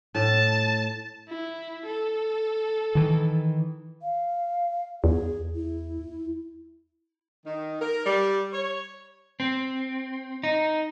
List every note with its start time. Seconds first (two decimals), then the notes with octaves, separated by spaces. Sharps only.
0.15 A2 A5
1.29 E4
1.86 A4
2.95 D#3 E3
4.02 F5
5.04 E2 G#4
5.55 E4
7.45 D#3
7.80 A#4
8.06 G3
8.53 C#5
9.40 C4
10.44 D#4